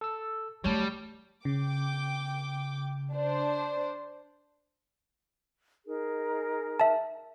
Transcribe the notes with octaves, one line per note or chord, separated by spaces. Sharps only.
A4 E6
F#3 G3 A3 C#5 A5
C#3 G5 D6
D4 C5
D#4 G#4 A#4
E5 A5